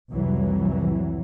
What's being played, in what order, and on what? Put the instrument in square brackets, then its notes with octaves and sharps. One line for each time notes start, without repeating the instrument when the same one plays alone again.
[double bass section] C2 F2 A2 E3 F#3